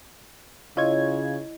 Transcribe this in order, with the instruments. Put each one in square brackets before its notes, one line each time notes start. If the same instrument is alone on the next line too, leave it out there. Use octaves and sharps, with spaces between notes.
[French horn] C#3 [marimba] E4 D#5 [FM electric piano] F4 C#5 G#6